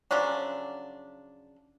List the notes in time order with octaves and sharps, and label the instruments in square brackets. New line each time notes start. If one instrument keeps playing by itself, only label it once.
[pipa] C#3 F3 F#3 D4